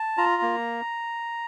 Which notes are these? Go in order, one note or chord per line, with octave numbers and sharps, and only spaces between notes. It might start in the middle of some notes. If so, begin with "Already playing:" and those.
Already playing: A5
F4 A#5
A#3